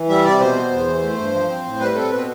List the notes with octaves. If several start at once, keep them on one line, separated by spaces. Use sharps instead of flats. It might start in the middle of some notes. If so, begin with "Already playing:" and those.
Already playing: E3
G3 E5
C3 D5
B2 C5
B3
E2
E3
A3
G2
F3
C4
A2
G3 B4
C4 A4
B2 B4